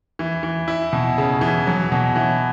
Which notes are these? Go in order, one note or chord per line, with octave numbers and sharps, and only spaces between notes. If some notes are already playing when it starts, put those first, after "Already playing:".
E3
E3
E4
B2
C#3
E3
F#3
B2
E3